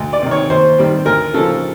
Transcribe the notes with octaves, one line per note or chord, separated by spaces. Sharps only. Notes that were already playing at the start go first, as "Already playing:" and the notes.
Already playing: D2
D5
C3 D#3
C#5
D#2 C5
D#3 G3 C4
D2 A#4
C#3 F3 A4